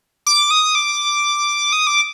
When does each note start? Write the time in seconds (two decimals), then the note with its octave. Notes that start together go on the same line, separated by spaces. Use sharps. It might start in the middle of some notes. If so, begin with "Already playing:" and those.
0.26 D6
0.51 D#6
0.75 D6
1.73 D#6
1.87 D6